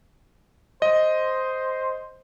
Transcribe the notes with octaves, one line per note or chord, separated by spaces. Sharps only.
C5 D#5